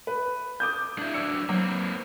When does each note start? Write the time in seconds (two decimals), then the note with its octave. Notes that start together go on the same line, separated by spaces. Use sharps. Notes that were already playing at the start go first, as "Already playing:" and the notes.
0.07 B4
0.60 D6 D#6 G6
0.99 D4 E4
1.14 F#3 D4 E6 C#7
1.49 F#3 A#3 C4